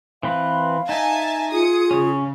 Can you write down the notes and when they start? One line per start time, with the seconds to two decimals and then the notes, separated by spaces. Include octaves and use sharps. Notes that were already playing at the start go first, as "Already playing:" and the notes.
0.23 E3 C4 B4 F5
0.89 D#4 E5 G#5 A5
1.52 F4 G#4 D#6 C#7
1.91 C#3 C#4